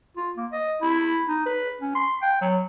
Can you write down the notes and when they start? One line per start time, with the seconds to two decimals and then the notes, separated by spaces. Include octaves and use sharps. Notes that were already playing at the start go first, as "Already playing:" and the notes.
0.17 F4
0.37 A#3
0.52 D#5
0.82 E4
1.29 D#4
1.46 B4
1.81 C#4
1.95 C6
2.22 G5
2.41 F#3